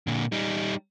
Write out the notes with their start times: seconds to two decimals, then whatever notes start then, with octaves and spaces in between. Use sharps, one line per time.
0.07 A#2 D3
0.32 G3 D#4